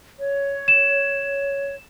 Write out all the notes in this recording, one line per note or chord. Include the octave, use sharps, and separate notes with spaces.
C#5
E7